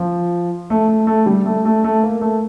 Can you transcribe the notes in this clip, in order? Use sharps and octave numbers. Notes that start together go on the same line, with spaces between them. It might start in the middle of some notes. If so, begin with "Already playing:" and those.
Already playing: F3
A3
A3
A3
G3
A3
A3
A3
A#3
A3